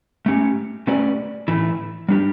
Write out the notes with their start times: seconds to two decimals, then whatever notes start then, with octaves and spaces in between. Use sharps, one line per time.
0.26 A3 C#4 G4
0.87 A3 C#4 G4 B4 D5
1.48 A2 E3 A3 E4
2.09 G3 D4 G4